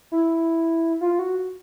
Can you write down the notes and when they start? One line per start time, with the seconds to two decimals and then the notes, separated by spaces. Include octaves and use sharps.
0.12 E4
1.01 F4
1.19 F#4